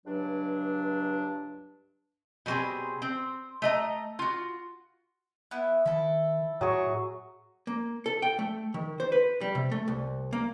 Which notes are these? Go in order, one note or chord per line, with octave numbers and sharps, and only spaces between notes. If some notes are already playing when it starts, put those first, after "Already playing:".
C#2 G2 F#3 D4
B2 G3 A#3 C4 G#4
C4
A3 D#5 A#5
F4 F#4
B3 E4
D#3 E4 A4
A2 F#3 G#4 C#6
A#3
A4
G5
A3
D#3
C5
B4
G3
C3
A3
C2
A#3